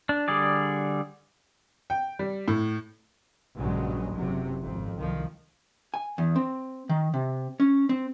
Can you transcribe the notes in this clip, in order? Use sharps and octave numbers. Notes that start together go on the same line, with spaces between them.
D4
D3 G3 G#4 D5
G5
G3
A2
A#1 G2 C#3 F#3 G#3
F#1 C3 F#3
G#1 F2
C2 D#3 F3
G#5
E2
C4
D#3
C3
C#4
C4